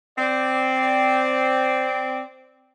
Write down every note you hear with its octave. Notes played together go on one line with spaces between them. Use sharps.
C4 D5